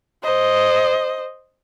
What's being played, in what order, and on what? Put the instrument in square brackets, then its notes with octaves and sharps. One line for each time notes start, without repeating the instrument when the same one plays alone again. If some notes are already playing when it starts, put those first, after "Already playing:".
[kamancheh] C5 D#5